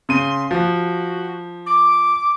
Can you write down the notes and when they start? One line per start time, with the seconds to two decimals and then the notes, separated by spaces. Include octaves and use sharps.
0.09 C#3 C6 D#7
0.51 F3 F#4
1.66 D6